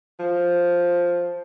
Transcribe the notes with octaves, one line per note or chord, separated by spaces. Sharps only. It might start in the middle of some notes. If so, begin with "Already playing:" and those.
F3